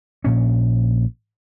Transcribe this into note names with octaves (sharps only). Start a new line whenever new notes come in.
A#1 A#2 C#4